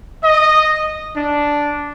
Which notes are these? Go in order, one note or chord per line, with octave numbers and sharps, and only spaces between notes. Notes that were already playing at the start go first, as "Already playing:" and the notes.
D#5
D4